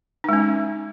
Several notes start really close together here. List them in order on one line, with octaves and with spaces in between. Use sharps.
D#4 G#3 C#4